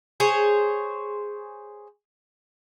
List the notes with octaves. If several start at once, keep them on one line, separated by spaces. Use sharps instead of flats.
G#4 C5 C#5